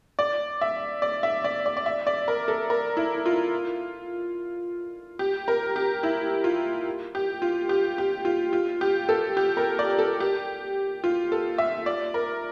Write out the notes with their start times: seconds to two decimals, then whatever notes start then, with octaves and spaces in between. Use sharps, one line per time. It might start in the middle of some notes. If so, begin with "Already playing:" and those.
0.19 D5
0.61 E5
1.02 D5
1.23 E5
1.44 D5
1.66 D5
1.77 D5
1.86 E5
2.07 D5
2.28 A#4
2.48 A4
2.70 A#4
2.97 E4
3.26 F4
5.19 G4
5.48 A#4
5.76 G4
6.03 E4
6.44 F4
7.15 G4
7.42 F4
7.69 G4
7.98 G4
8.25 F4
8.53 F4
8.81 G4
9.09 A4
9.37 G4
9.57 A#4
9.79 D5
9.99 A4
10.20 G4
11.04 F4
11.32 A4
11.58 E5
11.86 D5
12.14 A#4